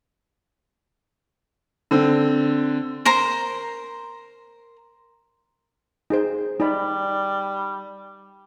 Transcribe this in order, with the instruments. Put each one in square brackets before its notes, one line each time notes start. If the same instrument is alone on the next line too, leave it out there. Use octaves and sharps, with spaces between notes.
[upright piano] D3 C4
[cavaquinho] A#4 C5 A#5
[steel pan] D#4 G#4 C5
[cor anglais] G3 [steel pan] D#4 D5 B5